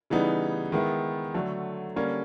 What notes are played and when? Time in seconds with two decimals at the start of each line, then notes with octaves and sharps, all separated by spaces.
0.10 C#3 E3 G3 B3 D#4
0.72 D#3 G#3 B3 E4
1.34 D3 F#3 A3
1.96 D3 G3 A#3 C#4